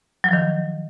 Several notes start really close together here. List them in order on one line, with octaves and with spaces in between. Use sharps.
F#3 F3 D#3